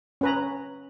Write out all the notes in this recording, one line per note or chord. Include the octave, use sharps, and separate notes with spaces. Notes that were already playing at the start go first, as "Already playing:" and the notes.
C#4 B4 A#5